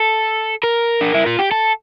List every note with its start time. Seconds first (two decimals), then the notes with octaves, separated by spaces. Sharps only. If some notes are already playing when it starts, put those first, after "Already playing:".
Already playing: A4
0.64 A#4
1.01 D4
1.14 E4
1.26 F4
1.39 G4
1.51 A4